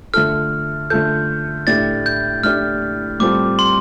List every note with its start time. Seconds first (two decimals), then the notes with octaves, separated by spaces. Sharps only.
0.14 D3 A3 F4 A4 F6
0.90 D3 A3 F4 A4 G6
1.67 A2 A3 D4 G4 A6
2.06 G6
2.44 A2 A3 D4 G4 F6
3.20 A2 G3 C4 F4 A4 D6
3.59 C6